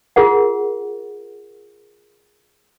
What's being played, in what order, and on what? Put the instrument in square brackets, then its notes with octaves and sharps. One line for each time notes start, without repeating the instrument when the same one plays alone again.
[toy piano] F4 G#4 A#4 F#5